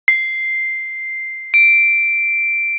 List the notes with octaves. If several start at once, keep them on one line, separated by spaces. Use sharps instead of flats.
C7
D7